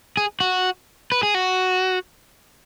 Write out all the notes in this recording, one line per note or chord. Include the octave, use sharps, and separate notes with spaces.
G#4
F#4
B4
G#4
F#4